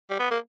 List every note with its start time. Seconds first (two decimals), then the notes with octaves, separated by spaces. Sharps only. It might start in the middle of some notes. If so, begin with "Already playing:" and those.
0.10 G3
0.19 B3
0.31 A#3